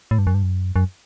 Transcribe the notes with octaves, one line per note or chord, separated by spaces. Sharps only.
A2
G2
F#2
G2
F#2
F#2